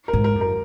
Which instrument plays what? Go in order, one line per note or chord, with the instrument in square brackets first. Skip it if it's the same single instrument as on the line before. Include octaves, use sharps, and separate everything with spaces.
[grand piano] A#4
[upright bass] G#2
[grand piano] A#4
[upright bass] F#2
[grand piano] A#4